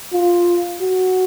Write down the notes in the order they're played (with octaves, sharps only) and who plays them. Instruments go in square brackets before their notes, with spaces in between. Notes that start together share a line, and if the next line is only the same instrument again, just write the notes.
[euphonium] F4
F#4